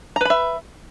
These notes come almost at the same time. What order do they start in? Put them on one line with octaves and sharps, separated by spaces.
A#5 B4 B5 E5